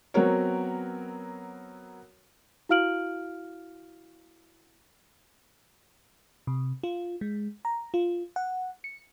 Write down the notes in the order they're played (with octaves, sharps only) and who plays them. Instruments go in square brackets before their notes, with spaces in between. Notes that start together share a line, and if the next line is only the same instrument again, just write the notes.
[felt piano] F#3 B3 C4 F#4 A#4 C#5
[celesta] E4 F#4 F5 F6 D7 F#7
[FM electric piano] C3
F4
G#3
A#5
F4
F#5
C#7